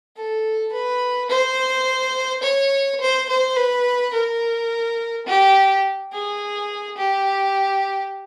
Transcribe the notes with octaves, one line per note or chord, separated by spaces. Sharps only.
A4
B4
C5
C#5
C5
C5
B4
A#4
G4
G#4
G4